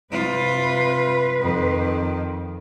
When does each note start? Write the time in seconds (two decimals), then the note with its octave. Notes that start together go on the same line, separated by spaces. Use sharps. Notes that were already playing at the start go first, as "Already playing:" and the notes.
0.11 C3 F4 B4
1.41 F2 D#3